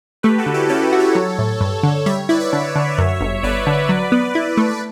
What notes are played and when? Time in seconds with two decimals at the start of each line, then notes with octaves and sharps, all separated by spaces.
0.23 A3 G4 B4
0.38 F#4 A4
0.46 D3
0.54 E4 G4
0.69 C#4 F#4 A4
0.92 F#4
1.00 A4 C#5
1.15 F#3
1.38 A2
1.61 G2
1.83 D3
2.06 G3 C#5 E5
2.29 E4 B4 D5
2.40 C#5 E5
2.53 D3
2.76 D3
2.98 F#2
3.21 G1
3.43 G1 B4 D5
3.67 D3
3.89 F#3
4.12 B3
4.35 E4
4.57 A3
4.69 D5